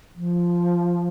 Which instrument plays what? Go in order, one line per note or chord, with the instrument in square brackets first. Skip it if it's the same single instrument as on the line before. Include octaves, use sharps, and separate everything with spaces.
[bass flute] F3